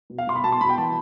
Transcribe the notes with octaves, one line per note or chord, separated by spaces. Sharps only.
B2
F5
B2 C6
B5
B2 A5
C6
B2 B5
G5
E3 A5